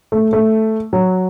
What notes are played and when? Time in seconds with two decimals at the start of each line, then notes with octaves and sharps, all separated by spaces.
0.12 A3
0.33 A3
0.93 F#3